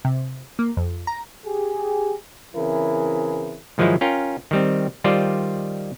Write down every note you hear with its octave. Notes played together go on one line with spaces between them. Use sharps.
C3
A#3
F2
A#5
G4 G#4
C#3 E3 C4 E4 G#4 A#4
G#2 D#3 F3 F#3 G#3 E4
C#4 F4 A#4 G5
D#3 G3 C4
D#3 G3 F4 C5 D5